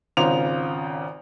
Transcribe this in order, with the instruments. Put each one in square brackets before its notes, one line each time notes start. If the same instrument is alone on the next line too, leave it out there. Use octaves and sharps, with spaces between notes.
[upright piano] G#1 C#3 F4 C5 A#5 F7